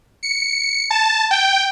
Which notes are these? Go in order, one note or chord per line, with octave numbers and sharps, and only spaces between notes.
C#7
A5
G5